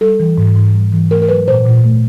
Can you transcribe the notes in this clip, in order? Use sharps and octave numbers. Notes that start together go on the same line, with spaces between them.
G3 A4
E3
G#2
G#2
G3
E3
A3 A#4
A#4
F#3 B4
A#2 C5
A#2
A3